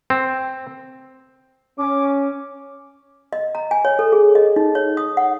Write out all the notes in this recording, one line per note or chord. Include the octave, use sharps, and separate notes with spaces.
C4
C#4 D6
D#5
A#5
G#5
C#5
A4
G#4
D#5
D#4
C#5
D#6
F#5